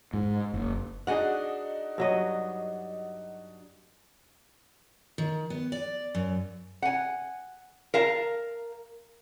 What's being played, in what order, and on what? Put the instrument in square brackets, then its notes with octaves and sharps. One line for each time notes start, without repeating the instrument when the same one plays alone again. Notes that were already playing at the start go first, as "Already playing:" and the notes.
[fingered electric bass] G#2
F#1
[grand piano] D4 D#4 F#4 [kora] G#4 D#5 F#5
[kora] G2 F#3 D#5
[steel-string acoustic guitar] D#3
B3
D5
F#2
[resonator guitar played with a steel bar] F#5 G#5
A#4 F5 A5 A#5